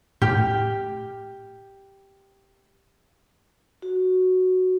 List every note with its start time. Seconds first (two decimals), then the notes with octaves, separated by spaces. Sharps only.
0.22 A2 G4 F6
3.82 F#4